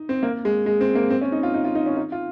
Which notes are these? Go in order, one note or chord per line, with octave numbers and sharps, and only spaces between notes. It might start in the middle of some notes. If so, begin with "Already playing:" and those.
Already playing: D#4
C4
A#3
G#3
G#3
C4
A#3
C4
C#4
D#4
F4
D#4
F4
D#4
C#4
D#4
F4